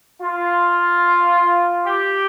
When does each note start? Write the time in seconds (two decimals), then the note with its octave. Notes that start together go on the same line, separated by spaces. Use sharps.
0.23 F4
1.86 G4